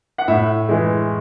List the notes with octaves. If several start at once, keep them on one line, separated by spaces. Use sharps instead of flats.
F#5
A2 E5
E3 G#3